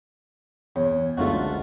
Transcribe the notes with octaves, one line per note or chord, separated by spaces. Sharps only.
E2 C#5
F#1 C#2 D3 A3 F4 F#4